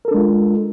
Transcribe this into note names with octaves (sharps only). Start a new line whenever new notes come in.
G#3 D4 F4 A4 A#4